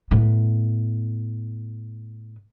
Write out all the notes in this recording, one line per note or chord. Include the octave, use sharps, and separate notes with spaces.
A2 B3